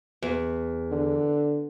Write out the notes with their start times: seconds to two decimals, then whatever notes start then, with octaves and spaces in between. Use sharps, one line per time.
0.22 E2
0.91 D3